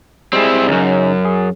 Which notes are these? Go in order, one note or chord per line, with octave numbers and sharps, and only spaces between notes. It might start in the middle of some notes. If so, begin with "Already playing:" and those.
G3 G#3 C4 E4 G#4
C#2 F#2 C#3 C#4 D#4
G#4